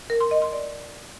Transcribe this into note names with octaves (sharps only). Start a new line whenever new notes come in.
A#4
C6
D#5
C6
D5